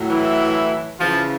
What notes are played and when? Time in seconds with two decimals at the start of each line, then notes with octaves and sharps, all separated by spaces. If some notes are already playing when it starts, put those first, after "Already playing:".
Already playing: A2 F#3
0.10 E3 E4
1.00 C#3 E3 F3 F4